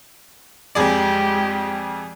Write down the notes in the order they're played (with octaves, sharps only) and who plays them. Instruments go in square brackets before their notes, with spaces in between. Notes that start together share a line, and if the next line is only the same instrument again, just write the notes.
[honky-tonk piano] F2 G#4 D5 [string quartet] G#3 G4